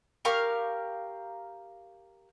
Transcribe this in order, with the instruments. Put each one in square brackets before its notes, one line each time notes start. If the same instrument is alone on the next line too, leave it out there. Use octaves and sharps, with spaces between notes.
[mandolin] G4 A#4 F5 C#6